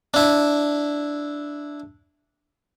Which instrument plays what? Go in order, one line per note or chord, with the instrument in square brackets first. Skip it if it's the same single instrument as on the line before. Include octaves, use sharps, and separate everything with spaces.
[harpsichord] D4 E4